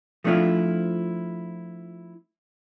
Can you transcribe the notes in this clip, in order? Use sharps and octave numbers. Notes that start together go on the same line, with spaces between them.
F3 A3 C4 D4 E4 F4